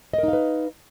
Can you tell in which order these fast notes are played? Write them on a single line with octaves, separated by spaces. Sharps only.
D#5 A#4 D#4 F5 B4